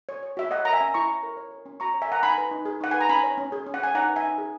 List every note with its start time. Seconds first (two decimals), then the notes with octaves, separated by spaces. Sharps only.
0.09 C#5
0.23 C#5
0.37 F#4 E5
0.51 C#5 D#5 F#5
0.65 A#4 A#5
0.73 E5 G#5
0.81 C#4
0.94 E4 A#5 C#6
1.08 C#5
1.23 A#4
1.37 C#5
1.51 A#4
1.66 C#4
1.80 F#4 A#5 C#6
1.94 C#5
2.02 E5 G#5
2.08 A#4 F#5 A#5
2.23 D#4 G#5 B5
2.38 B4
2.51 D#4
2.65 G#4
2.81 D#4 F#5
2.91 B4 G#5
3.01 A#5
3.09 C#4 G#5 B5
3.23 C#5
3.38 C#4
3.52 G#4
3.66 C#4
3.74 F#5
3.80 C#5 G#5
3.95 D#4 F#5 A#5
4.09 B4
4.16 E5 G#5
4.24 D#4
4.38 G#4